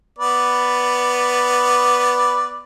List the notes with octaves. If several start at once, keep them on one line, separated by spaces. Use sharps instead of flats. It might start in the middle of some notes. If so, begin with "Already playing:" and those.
B3 B4 D5